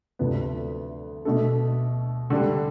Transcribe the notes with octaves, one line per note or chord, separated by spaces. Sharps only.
D2 C3 F3 B3
B2 A3 D4 A4
D3 G3 D4